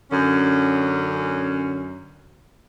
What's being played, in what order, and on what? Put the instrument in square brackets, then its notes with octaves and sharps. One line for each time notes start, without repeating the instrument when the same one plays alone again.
[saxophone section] F#2 D3 C#4